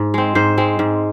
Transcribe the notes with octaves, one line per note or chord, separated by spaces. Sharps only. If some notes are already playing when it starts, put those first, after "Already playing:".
Already playing: G#2
G#3 C4
G#2 C5
G#3 C4
G#2